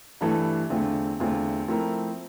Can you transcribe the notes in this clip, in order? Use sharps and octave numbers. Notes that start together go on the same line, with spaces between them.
G2 E3 A3 E4 A4
E2 D3 A3 C4 F4
E2 D3 A3 C4 F4
F3 A3 C4 E4 A#4